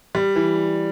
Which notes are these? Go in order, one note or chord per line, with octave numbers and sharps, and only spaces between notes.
G3
E3